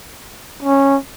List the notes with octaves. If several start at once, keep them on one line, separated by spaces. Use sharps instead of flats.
C#4